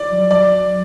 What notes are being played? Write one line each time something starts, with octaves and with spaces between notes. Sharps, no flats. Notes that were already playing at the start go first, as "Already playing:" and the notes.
Already playing: D5
F#3
F#3 D5